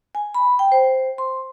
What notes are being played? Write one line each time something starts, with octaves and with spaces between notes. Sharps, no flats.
G#5
B5
G5
C5
C6